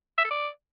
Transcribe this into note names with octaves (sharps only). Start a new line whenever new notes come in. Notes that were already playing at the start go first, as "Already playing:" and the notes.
E5
A4
D5